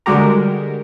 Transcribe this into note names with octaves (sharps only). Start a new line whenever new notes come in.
D3 G3 G#3 F#4 G4 A#4